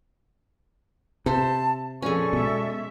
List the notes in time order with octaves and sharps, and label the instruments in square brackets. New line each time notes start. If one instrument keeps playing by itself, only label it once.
[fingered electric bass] C3 [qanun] C5 E5 [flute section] A5
[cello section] F2 A#2 F3 [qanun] C#4 G#4 [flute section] A4 D5 C#6
[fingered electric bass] B2 [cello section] G#3 E5